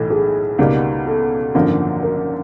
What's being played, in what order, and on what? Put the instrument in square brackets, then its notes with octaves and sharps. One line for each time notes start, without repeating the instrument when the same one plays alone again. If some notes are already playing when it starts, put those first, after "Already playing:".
Already playing: [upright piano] B1 A2 E3 [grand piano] A4
[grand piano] G#4
[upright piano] C#2 B2 G3 A#3 D#4
[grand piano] A4
[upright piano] G#1 F#2 D3 F3 A#3
[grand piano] A#4